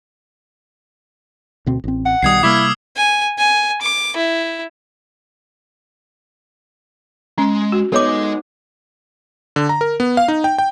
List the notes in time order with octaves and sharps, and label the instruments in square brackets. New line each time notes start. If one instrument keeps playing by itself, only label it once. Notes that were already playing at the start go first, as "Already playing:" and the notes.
[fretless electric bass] D2 B2 C4
A1 C4
[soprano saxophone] F#5
[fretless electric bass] B1 D#3 G3 [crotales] D#6 G#6 C7
[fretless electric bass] C3 G3 A#3 [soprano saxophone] E4 [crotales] D6 E6 F6
[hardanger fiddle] G#5
G#5
D6
E4
[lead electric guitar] G#3 [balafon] C#4
[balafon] F#4
[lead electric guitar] G#3 D#5 [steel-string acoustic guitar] B3 D#4 [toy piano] A4 C#5 D6
[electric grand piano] D3
A#5
A#4
B3
F5
D#4
G5
G5